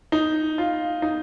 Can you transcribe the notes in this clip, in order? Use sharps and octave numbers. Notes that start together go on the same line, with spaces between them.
D#4
F4
D#4